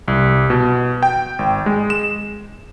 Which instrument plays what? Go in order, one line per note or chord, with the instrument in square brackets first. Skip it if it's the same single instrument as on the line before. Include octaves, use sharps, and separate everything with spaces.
[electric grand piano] C2
B2
G5
G#1
G#3
E7